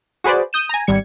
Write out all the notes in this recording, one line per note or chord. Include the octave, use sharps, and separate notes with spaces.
F#4 G#4 B4 C5 D5
D#6 G6 D#7 E7
G#5 A#5
G#1 G3 G#6 C#7